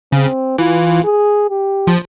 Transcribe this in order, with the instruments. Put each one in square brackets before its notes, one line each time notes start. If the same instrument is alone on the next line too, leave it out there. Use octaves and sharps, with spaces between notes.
[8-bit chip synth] C#3 [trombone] C4
[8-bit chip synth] E3 [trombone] F4
[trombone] G#4
G4
[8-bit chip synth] F3